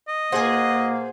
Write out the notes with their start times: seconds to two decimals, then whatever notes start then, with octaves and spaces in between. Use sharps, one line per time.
0.08 D#5
0.32 A#2 A#3 G#4 C5 F#5 G#5